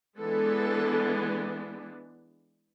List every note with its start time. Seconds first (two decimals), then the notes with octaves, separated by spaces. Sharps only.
0.17 E3 G#3 B3 D4 A4